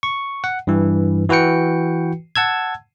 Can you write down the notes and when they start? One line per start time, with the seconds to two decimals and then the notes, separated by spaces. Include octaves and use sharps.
0.03 C#6
0.44 F#5
0.67 G2 E3
1.29 E3 F#4 B4 G5 C#7
2.36 F#5 A5 E6 G#6